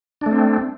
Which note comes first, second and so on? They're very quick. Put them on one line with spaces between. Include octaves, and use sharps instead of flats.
D4 A3 C4